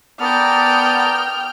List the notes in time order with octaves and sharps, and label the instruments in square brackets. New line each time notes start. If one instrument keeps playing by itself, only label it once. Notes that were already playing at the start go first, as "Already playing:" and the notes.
[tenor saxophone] B3 [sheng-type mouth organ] A#4 D5 A5 [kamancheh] G5 F6 [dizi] D#6